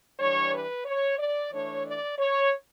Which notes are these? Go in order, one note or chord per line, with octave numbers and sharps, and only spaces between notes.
E3 G3 D4 C#5
B4
C#5
D5
E3 A3 D4 C#5
D5
C#5